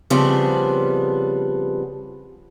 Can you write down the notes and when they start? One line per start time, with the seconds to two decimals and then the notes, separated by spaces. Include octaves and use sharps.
0.10 C#3 F3 G3 B3 C4 D4